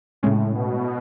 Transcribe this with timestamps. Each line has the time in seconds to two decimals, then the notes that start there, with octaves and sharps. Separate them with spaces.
0.23 A2 C#3 G#3 C#4
0.54 B2